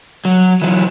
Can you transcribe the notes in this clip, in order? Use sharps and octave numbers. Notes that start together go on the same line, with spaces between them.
F#3
E3 F#3